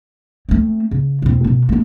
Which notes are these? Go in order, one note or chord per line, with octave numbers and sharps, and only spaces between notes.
A3 C4
C#3
E1 C4
B2 D#3
A3 B3